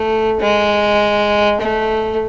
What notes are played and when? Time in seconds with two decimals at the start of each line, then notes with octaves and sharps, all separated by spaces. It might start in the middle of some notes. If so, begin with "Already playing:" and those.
Already playing: A3
0.41 G#3
1.61 A3